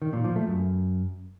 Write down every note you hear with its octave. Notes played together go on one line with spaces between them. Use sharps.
D#3
A#2
F3
A3
F#2